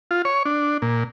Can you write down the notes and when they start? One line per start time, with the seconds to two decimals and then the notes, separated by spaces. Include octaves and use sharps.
0.11 F4
0.25 C#5
0.45 D4
0.82 A#2